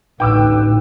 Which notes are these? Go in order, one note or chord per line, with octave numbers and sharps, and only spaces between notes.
A1 D2 A2 D#4 B4 G5 D6 E6